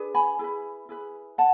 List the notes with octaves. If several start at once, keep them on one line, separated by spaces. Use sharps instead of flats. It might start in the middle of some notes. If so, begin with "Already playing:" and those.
Already playing: D4 G#4 B4
G#5 B5
E4 G#4 B4
E4 G#4 B4
F#5 A5